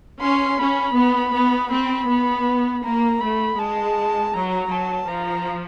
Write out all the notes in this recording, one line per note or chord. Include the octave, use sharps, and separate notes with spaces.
C#4 C6
C#4 B5
B3
B3
C4 B5
B3
A#3 A#5
A3 B5
G#3 A5
F#3 A#5
F#3 A5
F3 A#5